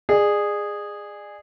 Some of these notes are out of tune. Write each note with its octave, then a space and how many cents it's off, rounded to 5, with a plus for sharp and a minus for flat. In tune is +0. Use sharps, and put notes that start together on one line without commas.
G#4 -10 D5 +35